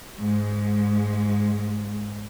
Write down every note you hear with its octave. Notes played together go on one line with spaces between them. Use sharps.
G#2 G#3